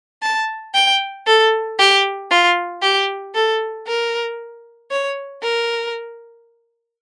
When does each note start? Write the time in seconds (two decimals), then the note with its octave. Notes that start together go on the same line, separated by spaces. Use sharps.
0.22 A5
0.74 G5
1.26 A4
1.78 G4
2.30 F4
2.82 G4
3.34 A4
3.87 A#4
4.90 C#5
5.43 A#4